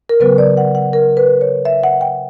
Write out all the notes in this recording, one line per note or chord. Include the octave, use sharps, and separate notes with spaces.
A#4
C#3 F#3 B3 B4
D5
F#5
F#5
A#4
B4
C#5
E5
F#5
G5